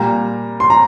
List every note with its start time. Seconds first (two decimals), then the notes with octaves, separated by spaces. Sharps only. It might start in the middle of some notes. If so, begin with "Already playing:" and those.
Already playing: A#2 G3 A#5
0.60 C6
0.70 A#5